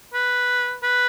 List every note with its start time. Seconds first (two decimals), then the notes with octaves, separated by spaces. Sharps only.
0.14 B4
0.83 B4